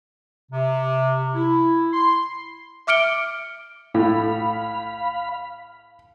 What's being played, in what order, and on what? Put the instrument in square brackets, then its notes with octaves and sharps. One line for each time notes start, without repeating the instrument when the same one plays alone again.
[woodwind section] C3
E4
C6
[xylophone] E5 D6 F6 C#7 D7 G7
[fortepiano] A2 [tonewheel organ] F5 B5